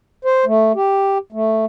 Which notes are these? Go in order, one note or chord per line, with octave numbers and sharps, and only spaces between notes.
C5
A3
G4
A3